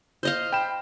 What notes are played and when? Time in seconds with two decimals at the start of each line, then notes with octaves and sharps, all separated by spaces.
0.23 C5 D#5 F5
0.53 G5 B5 E7